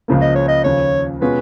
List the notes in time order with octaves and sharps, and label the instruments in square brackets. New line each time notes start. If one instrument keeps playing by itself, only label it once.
[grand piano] C#2 C#3 F3 A#3
[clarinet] D#5
C#5
D#5
[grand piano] D#2 C#3 F3 [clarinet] C#5
[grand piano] B2 G#3 C#4 F4 G#4 [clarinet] B4